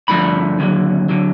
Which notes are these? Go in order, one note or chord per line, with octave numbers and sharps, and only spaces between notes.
G2 D3 F3 A3 B5
D#2 D3 F#3
D3 F#3